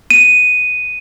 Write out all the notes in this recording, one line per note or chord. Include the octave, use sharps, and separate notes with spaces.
D#7